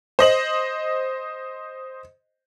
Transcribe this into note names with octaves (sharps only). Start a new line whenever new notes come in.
C5 D#5 F#7